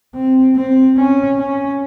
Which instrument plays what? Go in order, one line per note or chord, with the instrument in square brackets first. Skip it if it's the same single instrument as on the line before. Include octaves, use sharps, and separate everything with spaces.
[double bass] C4
C4
C#4
C#4